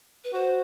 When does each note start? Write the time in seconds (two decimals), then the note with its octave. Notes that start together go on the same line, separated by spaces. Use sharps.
0.24 B4
0.33 F#4 C5